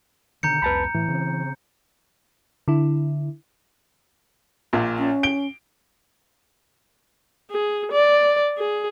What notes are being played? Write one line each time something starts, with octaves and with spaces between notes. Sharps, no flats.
B2 D3 D#3 A#5 G6 C#7
C2 F2 B4 A5 B5
A2 E3
C#3 C4
D3 E4
A#1 A#2
C#4
D7 G7
G#4
D5
G#4